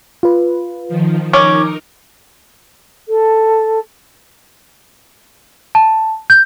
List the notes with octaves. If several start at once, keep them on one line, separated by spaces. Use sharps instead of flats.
F4 B4
D#3 F3
C#4 D#4 A#4 D6
A4
A5
G6